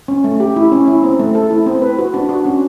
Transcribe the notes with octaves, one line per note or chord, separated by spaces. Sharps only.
C#4
A3
G4
E4
C#4
E4
C4
A3
A4
E4
C4
B4
F#4
D4
F#4
C#4